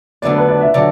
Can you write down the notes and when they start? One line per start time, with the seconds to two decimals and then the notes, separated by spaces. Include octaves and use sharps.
0.22 D2 D3 F#3 B3 D4 D5
0.36 B4
0.48 D5
0.61 E5
0.74 D3 F#3 D5